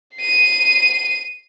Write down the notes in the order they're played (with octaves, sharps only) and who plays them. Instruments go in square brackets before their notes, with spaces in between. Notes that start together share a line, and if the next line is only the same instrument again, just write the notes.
[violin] C7 D#7